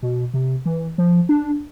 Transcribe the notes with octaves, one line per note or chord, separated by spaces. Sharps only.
B2
C3
E3
F3
D4